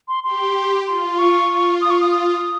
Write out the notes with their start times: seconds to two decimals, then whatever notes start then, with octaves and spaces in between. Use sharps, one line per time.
0.08 C6
0.24 G4 C6
0.86 F4 C6
1.18 C#6
1.49 F4
1.81 D#6
1.90 C#6
2.00 D#6
2.11 D#6